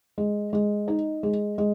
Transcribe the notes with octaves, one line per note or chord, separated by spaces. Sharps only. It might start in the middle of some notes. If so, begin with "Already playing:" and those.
G#3
G#3
D#4
G#3
G#3